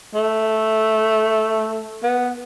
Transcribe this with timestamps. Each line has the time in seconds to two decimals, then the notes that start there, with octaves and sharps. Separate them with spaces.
0.15 A3
2.03 B3